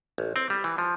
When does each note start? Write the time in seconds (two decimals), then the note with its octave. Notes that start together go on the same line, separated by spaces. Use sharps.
0.18 A1
0.36 C4
0.50 G3
0.64 E3
0.78 F3